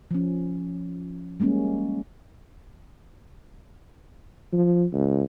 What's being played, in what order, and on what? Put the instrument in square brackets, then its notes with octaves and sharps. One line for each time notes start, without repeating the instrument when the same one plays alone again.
[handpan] F3 C#4
G3 G#3 A#3 C#4
[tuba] F3
C#2